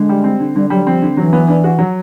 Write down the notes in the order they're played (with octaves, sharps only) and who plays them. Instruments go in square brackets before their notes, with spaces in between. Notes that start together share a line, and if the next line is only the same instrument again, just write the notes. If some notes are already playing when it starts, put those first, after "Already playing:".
Already playing: [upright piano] D3 [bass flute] G#3
[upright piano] G3
C4
D3
[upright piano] D3 [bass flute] G3
[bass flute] F#3 [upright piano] G3
[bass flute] F3 [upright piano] C4
[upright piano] D3
[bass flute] E3 [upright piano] F#3
[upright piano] B3
D4
F#4
F#3